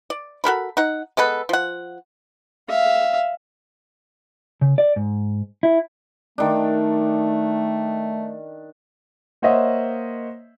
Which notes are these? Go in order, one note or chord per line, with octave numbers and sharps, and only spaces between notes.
D5
F#4 A4 A#4 B5
D#4 F#5
G#3 B3 A4 B4
F3 F#5
E5 F5
C#3
D5
G#2
E4
D#3 A3 D4
A#3 C5 C#5 D#5 E5 F#5